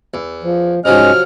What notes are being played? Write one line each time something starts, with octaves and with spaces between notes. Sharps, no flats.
E2
F3
G#2 C3 F3 F#3 C#4 D#5 F6